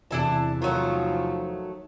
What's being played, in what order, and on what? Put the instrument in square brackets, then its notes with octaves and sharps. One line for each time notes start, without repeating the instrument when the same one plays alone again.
[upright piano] E2 C3 E3 [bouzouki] D4 E4 A5
[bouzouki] D#3 F#3 A3 [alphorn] F3